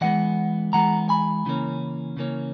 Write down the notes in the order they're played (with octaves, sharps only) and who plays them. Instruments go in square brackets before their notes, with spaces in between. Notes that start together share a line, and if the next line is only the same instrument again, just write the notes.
[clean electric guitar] E3 G#3 B3 D#5 F#5
E3 G#3 B3 F#5 A#5
G#5 B5
C#3 E3 A#3 C#4
C#3 E3 A#3 C#4